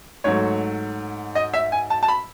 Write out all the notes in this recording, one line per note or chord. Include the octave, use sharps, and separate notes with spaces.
G#2 F#3 A3 C#5
D#5
E5
G#5
A5
A5
B5